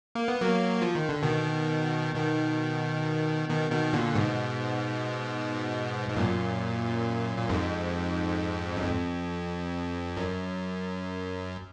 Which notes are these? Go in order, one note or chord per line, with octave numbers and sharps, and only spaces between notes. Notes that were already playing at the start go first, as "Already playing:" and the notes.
A#3
B3
F#3 A#3
F3
D#3
D3
B2 D#3
B2 D#3
B2 D#3
B2 D#3
A#2 D3
G#2 B2
G#2
F#2 A#2
A#2
F2 G#2
F#2
F2
F#2